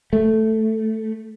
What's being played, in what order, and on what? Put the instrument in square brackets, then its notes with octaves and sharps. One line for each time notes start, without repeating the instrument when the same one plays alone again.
[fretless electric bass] A3